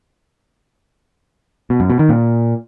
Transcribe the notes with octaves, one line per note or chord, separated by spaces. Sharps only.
B2
F#2
B2
D#3
A#2